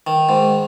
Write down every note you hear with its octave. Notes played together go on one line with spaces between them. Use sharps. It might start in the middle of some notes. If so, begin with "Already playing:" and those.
D#3
G#2